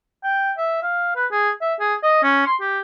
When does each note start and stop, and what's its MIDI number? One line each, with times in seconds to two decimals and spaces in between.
0.24 0.51 79
0.57 0.79 76
0.82 1.15 77
1.16 1.26 71
1.32 1.50 68
1.61 1.74 76
1.80 1.94 68
2.03 2.22 75
2.23 2.43 61
2.46 2.55 84
2.60 2.80 67